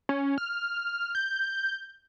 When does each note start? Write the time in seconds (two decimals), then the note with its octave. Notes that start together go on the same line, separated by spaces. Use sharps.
0.09 C#4
0.38 F6
1.15 G6